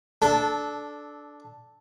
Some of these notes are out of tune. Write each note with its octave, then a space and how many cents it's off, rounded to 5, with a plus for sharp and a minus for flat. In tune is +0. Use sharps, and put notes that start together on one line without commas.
D4 +0 A4 -20